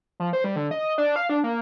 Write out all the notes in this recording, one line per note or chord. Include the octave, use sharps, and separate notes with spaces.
F3
C5
G3
D3
D#5
D4
F5
D4
A#3